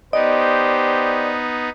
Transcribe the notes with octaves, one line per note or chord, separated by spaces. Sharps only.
B3 D#4 G4 C5 D5 D#5